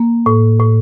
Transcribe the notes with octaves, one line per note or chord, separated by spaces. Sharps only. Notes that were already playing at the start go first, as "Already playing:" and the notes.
Already playing: A#3
A2
A2